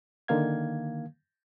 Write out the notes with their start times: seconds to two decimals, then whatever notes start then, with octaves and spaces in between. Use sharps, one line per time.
0.28 D3 D#3 A#3 F5 G#6